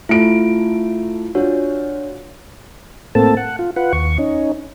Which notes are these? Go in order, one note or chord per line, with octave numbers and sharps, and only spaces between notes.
A3 E4 F4 D7
D4 F4 F#4 C#5
A2 A#3 C4 A4 A5
F#5
F4
F4 B4 F#5
D#2 C#6
C#4 D#4